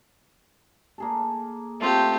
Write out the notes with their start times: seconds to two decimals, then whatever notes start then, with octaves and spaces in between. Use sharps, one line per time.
0.98 A#3 G#4 A4
1.81 A3 C4 F4 G4